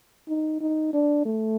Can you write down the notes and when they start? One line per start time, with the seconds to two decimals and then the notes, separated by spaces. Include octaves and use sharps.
0.28 D#4
0.60 D#4
0.93 D4
1.26 A3